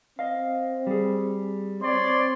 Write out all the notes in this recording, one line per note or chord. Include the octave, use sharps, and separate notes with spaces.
C4 D#5 F5
G3 G#4
C4 C#5 D5 C6